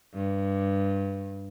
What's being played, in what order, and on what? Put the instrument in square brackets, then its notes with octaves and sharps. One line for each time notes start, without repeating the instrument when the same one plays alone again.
[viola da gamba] G2